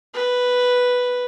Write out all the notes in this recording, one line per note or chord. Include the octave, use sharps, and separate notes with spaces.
B4